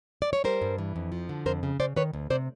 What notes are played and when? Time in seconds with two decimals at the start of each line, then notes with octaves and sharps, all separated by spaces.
0.22 D5
0.33 C#5
0.44 G3 A#4 C5
0.62 G2
0.78 E3
0.96 F2
1.12 F3
1.29 D3
1.46 F2 A#4 C5
1.63 C#3
1.80 C#3 C5 D5
1.96 D#3 B4 C#5
2.13 D2
2.30 C3 C5 D5